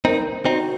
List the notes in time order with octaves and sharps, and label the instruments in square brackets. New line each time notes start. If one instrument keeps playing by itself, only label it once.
[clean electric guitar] C4 D#4 [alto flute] A#4
[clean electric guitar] C4 D#4 [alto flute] F#4